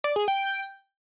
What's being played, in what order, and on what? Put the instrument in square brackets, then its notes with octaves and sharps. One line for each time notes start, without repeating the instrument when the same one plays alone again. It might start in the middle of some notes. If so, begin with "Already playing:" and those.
[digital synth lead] D5
G#4
G5